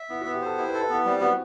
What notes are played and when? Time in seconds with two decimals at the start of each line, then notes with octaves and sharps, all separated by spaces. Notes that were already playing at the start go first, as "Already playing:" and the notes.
Already playing: E5
0.09 B3 E4
0.21 B3 F#4
0.34 G4
0.42 A4 C5
0.58 E4 G4
0.69 B4
0.74 A4
0.81 B4
0.90 B3 E4
1.05 G3 C4
1.21 B3 F#4